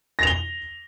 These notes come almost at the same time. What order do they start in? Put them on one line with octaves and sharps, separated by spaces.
A#6 F7 G7